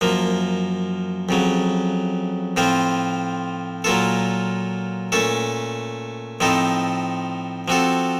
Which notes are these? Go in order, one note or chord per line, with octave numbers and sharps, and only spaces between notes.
F#2 F3 A#3
F2 C#3 F#3
A2 F3 C4 F4 C5
A#2 F#3 A#3 F4 A4
A#2 A3 C#4 A4
A2 F3 C4 D#4 A4
F3 C4 F#4 A4